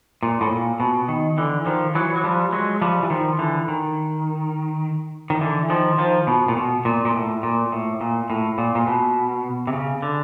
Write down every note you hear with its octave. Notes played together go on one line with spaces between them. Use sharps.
A#2
A2
A#2
B2
D#3
D3 E3
D#3 F3
E3 F#3
F#3
F3 G3
F#3 G#3
F3 G3
E3
D#3 F3
D3 E3
D#3
D#3
D3 E3
D#3 F3
D#3 F3
B2
A#2
B2
A#2
A#2
A2
A#2
A2
A#2
A2
A#2
A#2
B2
C3
C#3
D3